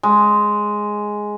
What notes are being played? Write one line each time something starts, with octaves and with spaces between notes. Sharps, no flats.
G#3